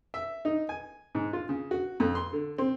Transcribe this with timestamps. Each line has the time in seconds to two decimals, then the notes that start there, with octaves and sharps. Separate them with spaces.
0.14 E5
0.45 D#4
0.69 G#5
1.15 G#2
1.33 F4
1.49 C#3
1.71 F#4
2.00 F2
2.15 C6
2.33 D3
2.58 C4